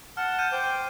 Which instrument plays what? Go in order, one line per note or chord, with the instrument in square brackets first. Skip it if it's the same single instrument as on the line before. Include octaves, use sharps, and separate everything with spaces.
[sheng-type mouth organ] F#5 A5 [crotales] F6
[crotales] F6 G6 D#7
[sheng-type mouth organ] C5 G5 D6